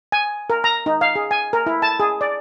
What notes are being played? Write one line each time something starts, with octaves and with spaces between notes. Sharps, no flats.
G#5
A#4
A#5
D#4
F5
G#4
G#5
A#4
E4
A5
G#4
D5